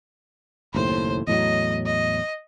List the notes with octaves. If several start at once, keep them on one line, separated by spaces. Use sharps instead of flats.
F#1 D#2 A2 C5
E2 A2 F#3 D#5
D#5